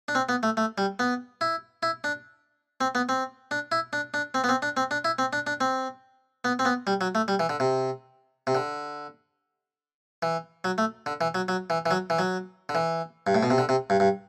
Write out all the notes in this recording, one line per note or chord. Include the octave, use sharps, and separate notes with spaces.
D4
C4
B3
A3
A3
G3
B3
E4
E4
D4
C4
B3
C4
D4
E4
D4
D4
C4
B3
C4
D4
C4
D4
E4
C4
D4
D4
C4
B3
C4
B3
G3
F#3
A3
G3
E3
D3
C3
C3
D3
E3
F#3
A3
D3
E3
F#3
F#3
E3
E3
F#3
E3
F#3
D3
E3
G2
A2
B2
C3
D3
C3
G2
G2